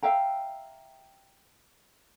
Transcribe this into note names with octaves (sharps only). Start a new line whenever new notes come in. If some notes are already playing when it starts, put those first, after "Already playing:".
E5 F5 G5 A#5